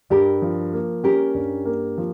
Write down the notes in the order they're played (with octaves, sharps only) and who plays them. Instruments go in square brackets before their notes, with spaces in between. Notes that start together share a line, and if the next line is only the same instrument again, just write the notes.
[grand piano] G2 [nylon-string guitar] G4 A#4
[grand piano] F3
A#3
[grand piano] C#4 [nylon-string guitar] G4 A#4
[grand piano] G2
A#3
F3